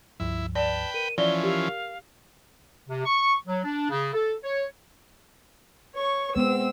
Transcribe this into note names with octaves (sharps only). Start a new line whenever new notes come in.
C#2 G2 F3 E4
B4 D5 G5 A5
A#4 D#7
E3 F3 C#4 D5 G7
G4 F5
C3
C#6
F#3
D4
C#3
A4
C#5
C#5 C#6
G#3 B3 C4 E6